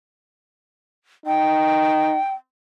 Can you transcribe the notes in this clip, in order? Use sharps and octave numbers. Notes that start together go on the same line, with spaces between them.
D#4 G5